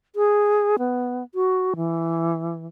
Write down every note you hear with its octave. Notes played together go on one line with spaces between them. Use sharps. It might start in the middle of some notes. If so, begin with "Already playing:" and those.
G#4
B3
F#4
E3